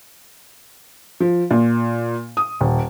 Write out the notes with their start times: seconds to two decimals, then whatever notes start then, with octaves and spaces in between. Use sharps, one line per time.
1.20 F3
1.51 A#2
2.37 D#6
2.61 D#1